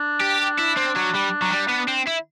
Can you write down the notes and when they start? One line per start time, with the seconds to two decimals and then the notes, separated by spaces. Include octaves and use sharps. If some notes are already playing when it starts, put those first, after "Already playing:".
Already playing: D4
0.21 G4
0.58 E4
0.76 C4
0.96 F#3
1.14 G3
1.42 F#3
1.50 G3
1.69 B3
1.88 C4
2.07 E4